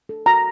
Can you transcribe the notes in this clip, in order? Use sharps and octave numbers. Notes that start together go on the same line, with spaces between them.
A4
F#4 A#5